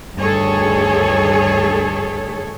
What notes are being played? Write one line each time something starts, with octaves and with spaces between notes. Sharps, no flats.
D2 G2 D#3 G#4 A4 C#5